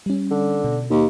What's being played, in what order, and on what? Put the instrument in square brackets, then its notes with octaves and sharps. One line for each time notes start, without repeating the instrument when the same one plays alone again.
[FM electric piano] G3 C#4
[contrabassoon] D3
[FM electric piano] B2
[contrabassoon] D#2